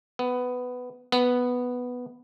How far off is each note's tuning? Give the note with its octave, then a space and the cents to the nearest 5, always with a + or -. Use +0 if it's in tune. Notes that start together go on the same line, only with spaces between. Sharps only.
B3 +10
B3 +0